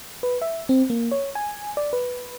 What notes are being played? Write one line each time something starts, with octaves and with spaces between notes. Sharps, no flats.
B4
E5
C4
A#3
C#5
G#5
D5
B4